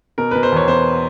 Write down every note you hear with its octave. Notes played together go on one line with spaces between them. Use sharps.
B2 A#4
B2 B4
C5
E2 C#5
B2 C5